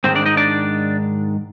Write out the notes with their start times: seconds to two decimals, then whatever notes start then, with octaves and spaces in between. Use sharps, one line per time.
0.04 G#2 D#3 G#3 C4 C5
0.15 D4 D5
0.26 D#4 D#5
0.37 D4 D5